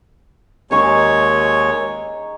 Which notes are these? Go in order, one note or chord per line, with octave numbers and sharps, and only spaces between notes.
D#2 G#3 D#4 G#4 C#5 C#6